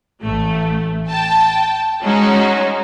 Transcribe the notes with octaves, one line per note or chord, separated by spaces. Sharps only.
A1 A3
G5 A5
G#3 C#4 D#4 F#4